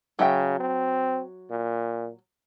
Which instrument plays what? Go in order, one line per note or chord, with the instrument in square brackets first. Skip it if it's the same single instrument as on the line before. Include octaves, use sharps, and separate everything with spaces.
[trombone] C#3 [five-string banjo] F#3 E5 G5
[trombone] C4
A#2